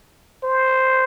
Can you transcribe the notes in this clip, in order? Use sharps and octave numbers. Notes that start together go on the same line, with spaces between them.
C5